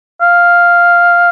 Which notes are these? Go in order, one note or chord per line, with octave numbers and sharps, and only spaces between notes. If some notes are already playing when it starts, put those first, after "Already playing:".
F5